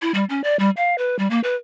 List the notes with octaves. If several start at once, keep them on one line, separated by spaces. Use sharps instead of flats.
E4
G3
C#4
D5
G3
F5
B4
G3
A#3
B4